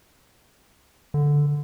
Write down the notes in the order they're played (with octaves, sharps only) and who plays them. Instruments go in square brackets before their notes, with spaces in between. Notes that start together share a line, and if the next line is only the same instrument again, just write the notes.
[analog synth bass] D3